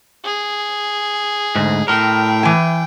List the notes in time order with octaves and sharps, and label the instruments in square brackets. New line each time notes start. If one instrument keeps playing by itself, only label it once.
[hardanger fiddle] G#4
[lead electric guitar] D2 G#2
[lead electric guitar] A2 A#4 [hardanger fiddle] G5
[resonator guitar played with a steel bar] E3 G#5